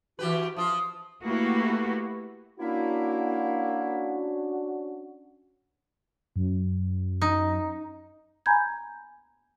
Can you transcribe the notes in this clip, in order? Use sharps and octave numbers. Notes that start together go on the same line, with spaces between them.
E3 F#4 G4 B4
F3 F4 D#6
A3 A#3 E4 F#4 G4 B4
A#3 C#4 D4 E4 F#4
F#2
D#4
G#5 A#5 B5 G6 G#6